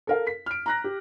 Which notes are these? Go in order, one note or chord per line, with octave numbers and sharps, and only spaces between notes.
A4 A#4 F5
B6
F6 D7
A#5 F#6 A#6
G4